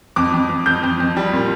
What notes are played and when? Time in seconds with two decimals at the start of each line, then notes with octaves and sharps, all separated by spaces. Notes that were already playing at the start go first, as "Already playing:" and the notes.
0.16 F2 D6
0.34 F2
0.50 F2
0.66 F2 G6
0.84 F2
1.00 F2
1.17 G3
1.33 A#2